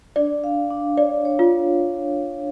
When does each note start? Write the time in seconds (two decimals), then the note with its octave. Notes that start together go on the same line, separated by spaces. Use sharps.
0.16 D4 D5
0.44 F5
0.70 D4
0.97 C#5 D5
1.25 C#5
1.39 F4